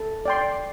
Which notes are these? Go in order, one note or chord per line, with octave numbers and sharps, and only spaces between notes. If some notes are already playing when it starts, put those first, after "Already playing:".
Already playing: A4
D5 G5 C6